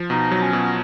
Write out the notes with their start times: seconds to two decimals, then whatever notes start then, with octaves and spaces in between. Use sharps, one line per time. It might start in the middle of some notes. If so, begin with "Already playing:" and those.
Already playing: F3
0.09 B2 D#4
0.31 F#3
0.42 C#4
0.53 B2